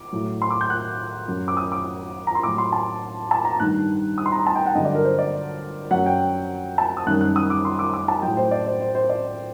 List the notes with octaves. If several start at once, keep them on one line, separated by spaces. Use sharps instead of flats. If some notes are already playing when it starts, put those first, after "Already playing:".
Already playing: D6
A2 F#3
C6
D6
G6
F#6
F#2 F#3
D6
D#6
D6
A#5
C6
A2 F#3 D6
C6
A5
A5
A#5
G2 D#3 G3 F#6
D#6
C6
A#5
A5
G5
F#5
G2 D3 F#3 D#5
D5
A#4
C5
D5
F#2 F#3 F#5
G5
A5
D#6
F#2 D#3 G3 F#6
F#6
D#6
D6
C6
D6
D6
A5
A2 F#3 G5
C5
D5
C5
C5
C5
D5